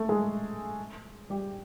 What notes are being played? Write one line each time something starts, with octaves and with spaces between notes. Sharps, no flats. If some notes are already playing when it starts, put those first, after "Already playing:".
Already playing: A3 A4
G#3 G#4
G3 G4